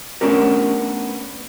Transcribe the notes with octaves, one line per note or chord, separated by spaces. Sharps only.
A3 B3 C#4 D4 G4 A#4